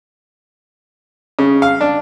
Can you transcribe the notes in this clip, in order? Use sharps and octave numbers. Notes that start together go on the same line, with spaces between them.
C#3
F5
D4